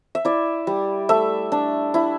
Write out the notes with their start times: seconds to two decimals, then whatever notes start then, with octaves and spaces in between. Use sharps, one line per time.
0.15 E5
0.25 E4 D5
0.67 G3
1.09 A3 E5
1.52 D4
1.94 E4